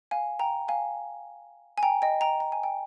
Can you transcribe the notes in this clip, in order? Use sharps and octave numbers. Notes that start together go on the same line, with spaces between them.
F5 G#5
G5 A#5
F5 G#5
G#5
G5 A#5
D#5 G5
G5 A#5
A#5
G#5
G5